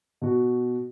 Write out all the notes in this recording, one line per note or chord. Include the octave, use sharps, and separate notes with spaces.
B2 F#4